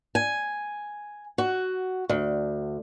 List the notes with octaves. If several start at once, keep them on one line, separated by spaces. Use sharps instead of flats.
G#5
F#4
D2